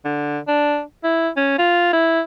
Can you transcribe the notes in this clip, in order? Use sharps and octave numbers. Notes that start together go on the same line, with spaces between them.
D3
D4
E4
C#4
F4
E4